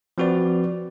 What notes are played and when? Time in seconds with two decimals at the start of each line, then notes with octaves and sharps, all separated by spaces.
0.18 F3 C4 F#4 B4 D5